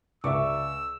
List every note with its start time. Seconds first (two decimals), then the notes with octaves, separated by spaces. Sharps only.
0.24 C#2 D5 E5 C#6 D6 E6